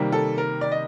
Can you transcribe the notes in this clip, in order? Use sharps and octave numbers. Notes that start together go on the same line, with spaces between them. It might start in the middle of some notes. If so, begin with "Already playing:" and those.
Already playing: C3 D#3 G3 A#3
A4
A#4
D5
D#5